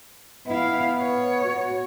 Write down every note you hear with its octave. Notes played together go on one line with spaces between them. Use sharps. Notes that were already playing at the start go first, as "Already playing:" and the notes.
B3 E4 F5
C#5
F#4